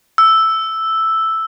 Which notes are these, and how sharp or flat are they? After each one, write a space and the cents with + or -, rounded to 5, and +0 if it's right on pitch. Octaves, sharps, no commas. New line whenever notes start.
E6 +0